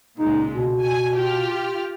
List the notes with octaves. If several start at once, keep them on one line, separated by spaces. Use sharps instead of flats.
C#2 A#2 G#3 D#4
B2
G#5
F4 G4 F6